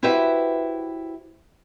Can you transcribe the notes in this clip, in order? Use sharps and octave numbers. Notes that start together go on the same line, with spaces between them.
E4 F#4 G4 B4 C5 E5